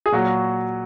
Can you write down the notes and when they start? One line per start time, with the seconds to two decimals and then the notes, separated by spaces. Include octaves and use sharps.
0.06 G#4
0.12 A#2 F#3 F#4